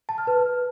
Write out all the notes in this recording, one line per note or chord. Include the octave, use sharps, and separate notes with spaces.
A5
F6
B4